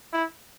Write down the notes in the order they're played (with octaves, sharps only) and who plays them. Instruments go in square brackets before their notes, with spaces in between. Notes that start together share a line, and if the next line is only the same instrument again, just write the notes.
[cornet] E4